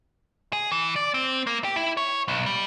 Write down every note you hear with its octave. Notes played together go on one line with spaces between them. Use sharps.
G#4
E3
D5
C4
A#3
G4
E4
C#5
B1
G3